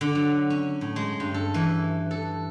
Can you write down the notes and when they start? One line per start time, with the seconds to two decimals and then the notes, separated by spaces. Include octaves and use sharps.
0.01 D3
0.15 F#3
0.50 C#4
0.81 A2
0.96 G#3
1.20 G2
1.34 A4
1.54 E3
2.11 A4